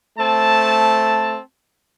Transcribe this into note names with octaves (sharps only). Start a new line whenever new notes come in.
A3 C4 A5